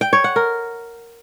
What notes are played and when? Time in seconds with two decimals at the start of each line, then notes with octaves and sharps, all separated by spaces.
0.01 G5
0.13 C#5
0.24 F#5
0.36 A#4